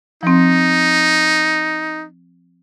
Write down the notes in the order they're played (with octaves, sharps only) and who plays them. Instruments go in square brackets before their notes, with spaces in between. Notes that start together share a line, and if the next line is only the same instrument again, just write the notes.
[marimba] F3 C4 [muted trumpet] D#4